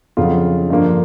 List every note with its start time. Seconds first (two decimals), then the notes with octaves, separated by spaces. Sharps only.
0.17 F2 C#3 F#3 F4
0.70 G2 D3 F3 A#3